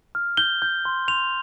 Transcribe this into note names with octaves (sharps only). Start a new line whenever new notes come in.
F6
G6 G7
G6
C6
C6 F7